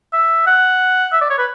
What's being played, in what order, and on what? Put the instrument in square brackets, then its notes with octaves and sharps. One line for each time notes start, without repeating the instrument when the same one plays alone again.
[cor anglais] E5
F#5
E5
D5
C#5
B4